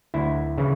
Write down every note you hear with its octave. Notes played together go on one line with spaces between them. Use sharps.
D2 E4
C#3 E3